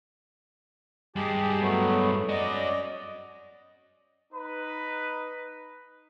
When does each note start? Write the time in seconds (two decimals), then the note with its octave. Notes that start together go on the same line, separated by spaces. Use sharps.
1.16 G2 G#3 G4 G#4 A5
1.60 F#3 A3 B3
2.29 C#4 F#4 D5 D#5
4.33 D#4 B4